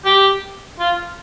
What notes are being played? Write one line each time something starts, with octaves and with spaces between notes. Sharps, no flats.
G4
F4